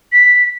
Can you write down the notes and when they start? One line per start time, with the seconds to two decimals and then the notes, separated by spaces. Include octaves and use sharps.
0.12 B6